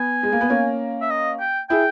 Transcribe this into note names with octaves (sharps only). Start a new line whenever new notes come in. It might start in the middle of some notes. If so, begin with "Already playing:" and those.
Already playing: B3 G#5
G#3
A#3
B3
A#3 C#4
E5
D#5
G5
E4 G#4 G5